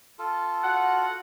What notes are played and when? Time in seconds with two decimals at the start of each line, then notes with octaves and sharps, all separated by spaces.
0.19 F4 A4
0.63 F#4 F#5